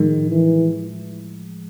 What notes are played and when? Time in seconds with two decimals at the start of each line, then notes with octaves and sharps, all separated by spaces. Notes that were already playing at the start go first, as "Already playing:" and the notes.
Already playing: A2 D#3 F3 G#3
0.30 E3